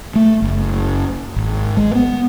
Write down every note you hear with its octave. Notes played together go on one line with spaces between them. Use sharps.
A3
F#1
G#1
G#3
B3